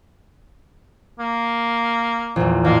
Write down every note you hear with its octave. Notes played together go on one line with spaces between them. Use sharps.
A#3
A#1 E2
A1 A#3 F6